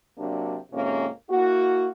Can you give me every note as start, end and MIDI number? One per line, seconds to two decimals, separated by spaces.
0.18 0.56 48
0.18 0.56 54
0.18 0.56 58
0.18 0.56 62
0.72 1.08 41
0.72 1.08 44
0.72 1.08 48
0.72 1.08 58
0.72 1.08 61
1.30 1.88 58
1.30 1.88 64
1.30 1.88 66